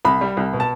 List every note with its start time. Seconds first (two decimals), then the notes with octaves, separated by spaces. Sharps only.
0.05 C2 B5
0.21 G3
0.37 C2
0.53 B2
0.60 A5